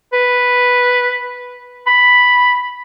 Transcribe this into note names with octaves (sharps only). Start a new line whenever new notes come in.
B4
B5